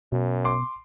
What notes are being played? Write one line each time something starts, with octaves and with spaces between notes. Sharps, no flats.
F#2 B2
C6 D6